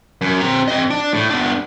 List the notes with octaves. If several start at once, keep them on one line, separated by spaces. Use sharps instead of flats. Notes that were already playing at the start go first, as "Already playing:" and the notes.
F#2
C4 A#5
C4 D#5
D4
A2
B3 D4